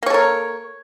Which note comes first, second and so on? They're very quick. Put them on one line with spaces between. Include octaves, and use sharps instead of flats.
A#3 C#5 A4 A#4